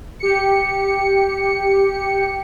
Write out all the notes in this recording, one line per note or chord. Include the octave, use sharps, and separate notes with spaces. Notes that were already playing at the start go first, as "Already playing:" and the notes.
G4 C#7